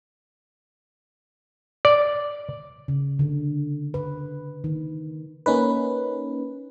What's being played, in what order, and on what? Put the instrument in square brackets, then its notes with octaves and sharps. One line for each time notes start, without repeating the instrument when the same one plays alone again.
[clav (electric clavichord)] D5
[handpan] C#3
D3
B4
D#3
[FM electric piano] A#3 C#4 D#4 B4